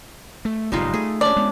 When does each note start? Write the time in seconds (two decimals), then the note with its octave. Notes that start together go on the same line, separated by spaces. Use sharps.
0.45 A3
0.72 F#1 G#2 B2 G3 D#4 F4
0.94 A3 G#4
1.21 C#4 D4 D5
1.36 G#3 B3